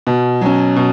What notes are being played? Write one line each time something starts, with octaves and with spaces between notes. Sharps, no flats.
B2
F#3 C#4
B2